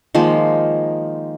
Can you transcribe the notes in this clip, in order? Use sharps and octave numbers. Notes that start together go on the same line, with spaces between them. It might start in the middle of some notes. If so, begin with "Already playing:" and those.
D#3 F3 G#3 A#3